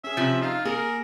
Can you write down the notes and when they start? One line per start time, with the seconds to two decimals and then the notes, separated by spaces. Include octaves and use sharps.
0.04 C#4 G#4 E5
0.17 C3 F3
0.42 D#4 F4 F5
0.65 A#3 G#4 A#4